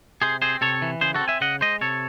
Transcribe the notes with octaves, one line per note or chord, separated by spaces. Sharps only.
C3 G#4 C5
C4 G#4 C5
C3 A4 C#5
E3
C#3 G#4 C5
F#4 A4
C4
E5 G#5
C#3 D#5 F#5
G#3 C5 D#5
C3 A4 C#5